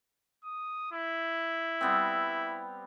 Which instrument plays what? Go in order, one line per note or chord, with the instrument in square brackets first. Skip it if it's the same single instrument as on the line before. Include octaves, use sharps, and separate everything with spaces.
[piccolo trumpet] D#6
E4
[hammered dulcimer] G3 B3 C4